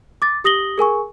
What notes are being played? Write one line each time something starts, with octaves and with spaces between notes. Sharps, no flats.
D6 A6
G4 D#6 A#6 F#7 G7
G#4 A#4 G#5 C#6